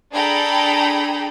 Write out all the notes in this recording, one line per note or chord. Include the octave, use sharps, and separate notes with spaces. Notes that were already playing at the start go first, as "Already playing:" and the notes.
D4 G#4 A4 G5 A#5 B5